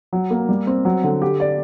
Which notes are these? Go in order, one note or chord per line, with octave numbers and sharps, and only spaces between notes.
F#3
A#3
G3
C4
F#3
D3
G4
D5